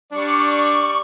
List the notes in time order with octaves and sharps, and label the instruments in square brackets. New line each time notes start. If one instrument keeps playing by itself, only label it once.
[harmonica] G3 D5 [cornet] D4 [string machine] C#6